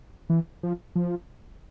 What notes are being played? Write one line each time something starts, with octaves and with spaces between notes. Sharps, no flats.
E3
F3
F3